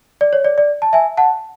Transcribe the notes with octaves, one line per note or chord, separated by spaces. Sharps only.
D5
C#5
D5
D5
A5
E5 G#5
F#5 A5